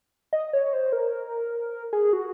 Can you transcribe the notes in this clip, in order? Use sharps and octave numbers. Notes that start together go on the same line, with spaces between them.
D#5
C#5
C5
A#4
G#4
F#4